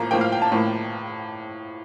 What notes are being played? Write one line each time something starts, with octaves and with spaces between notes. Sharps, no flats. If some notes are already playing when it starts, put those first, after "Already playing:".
Already playing: A2 F3 A#3 A#5
A2 F3 A#3 G5
F5
G5
A5
A2 F3 A#3